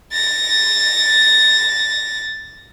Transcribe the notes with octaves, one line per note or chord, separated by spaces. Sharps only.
A6 A#6